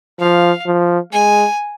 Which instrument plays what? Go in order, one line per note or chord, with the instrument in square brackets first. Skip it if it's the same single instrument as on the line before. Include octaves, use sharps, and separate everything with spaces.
[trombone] F3 [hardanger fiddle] F5
[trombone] F3
[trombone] G#3 [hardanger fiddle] G#5